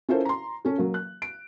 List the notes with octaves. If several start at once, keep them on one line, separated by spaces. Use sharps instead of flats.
C#4 E4 F4 A4 A#4 C5
A#5 C6
C#4 A4
F#3 A#3
F#6
D7